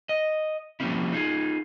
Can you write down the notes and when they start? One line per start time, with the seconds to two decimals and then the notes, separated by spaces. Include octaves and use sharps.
0.09 D#5
0.80 F3 G3 A#3 C4 C#4 E4
1.13 D#4 F4 G#4